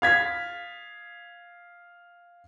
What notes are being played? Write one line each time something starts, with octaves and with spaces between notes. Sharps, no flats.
F5 G#6 B6